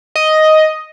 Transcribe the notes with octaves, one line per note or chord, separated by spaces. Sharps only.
D#5